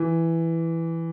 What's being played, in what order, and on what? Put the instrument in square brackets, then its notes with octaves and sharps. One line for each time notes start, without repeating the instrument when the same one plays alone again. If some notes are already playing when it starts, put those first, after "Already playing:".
Already playing: [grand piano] E3